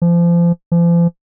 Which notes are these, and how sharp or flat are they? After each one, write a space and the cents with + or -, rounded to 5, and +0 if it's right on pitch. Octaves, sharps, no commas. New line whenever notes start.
F3 -30
F3 -40